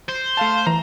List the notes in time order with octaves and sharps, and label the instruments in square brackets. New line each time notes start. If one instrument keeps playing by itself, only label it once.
[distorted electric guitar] C5
[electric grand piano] A3 F5 A5
[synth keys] E3 [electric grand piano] A#5